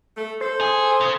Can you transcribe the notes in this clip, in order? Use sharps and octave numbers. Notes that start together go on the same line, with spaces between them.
A3
A4 C5
G#4
C#3